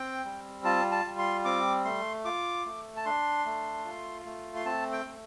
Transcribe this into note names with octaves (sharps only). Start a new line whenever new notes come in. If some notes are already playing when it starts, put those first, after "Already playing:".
Already playing: C4 G5
G3
F4 A5
A5
G3
C6
C4 D6
A3 C6
F4 D6
A3
A5
D4 C6
A3
F4
A3
C6
C4 A5
G5
A3